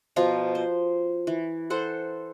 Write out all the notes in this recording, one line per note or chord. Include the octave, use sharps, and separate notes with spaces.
B2 F3 F4 A#5
C5
E3
A4 C5 F#5